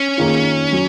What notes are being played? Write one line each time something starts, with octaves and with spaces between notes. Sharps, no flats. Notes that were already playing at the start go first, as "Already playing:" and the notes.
Already playing: C#4
D#3 A#3 F4 G#4
F#3